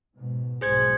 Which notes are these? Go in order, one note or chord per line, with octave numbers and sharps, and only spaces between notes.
G#2 B2
B1 G#2 F3 G#4 C5 G#6